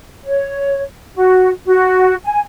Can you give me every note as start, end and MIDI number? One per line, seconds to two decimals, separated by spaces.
0.24 0.83 73
1.16 1.51 66
1.67 2.15 66
2.25 2.41 80